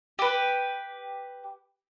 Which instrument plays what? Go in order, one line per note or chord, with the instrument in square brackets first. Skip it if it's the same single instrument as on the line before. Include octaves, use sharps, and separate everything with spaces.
[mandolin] G4 B4